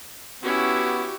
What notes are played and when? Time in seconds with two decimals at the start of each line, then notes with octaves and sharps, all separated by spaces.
0.43 B3 C#4 E4 F#4 G4